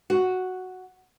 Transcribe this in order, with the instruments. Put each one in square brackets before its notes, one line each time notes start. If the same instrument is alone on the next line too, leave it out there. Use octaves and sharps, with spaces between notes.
[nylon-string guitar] F#4